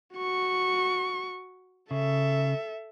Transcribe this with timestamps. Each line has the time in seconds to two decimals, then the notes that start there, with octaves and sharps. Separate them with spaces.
0.15 F#4 C#6
1.91 C#3 A4 E5